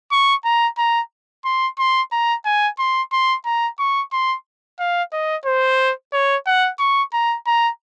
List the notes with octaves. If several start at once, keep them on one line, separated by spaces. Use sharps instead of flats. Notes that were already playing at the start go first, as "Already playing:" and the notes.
C#6
A#5
A#5
C6
C6
A#5
G#5
C6
C6
A#5
C#6
C6
F5
D#5
C5
C#5
F#5
C#6
A#5
A#5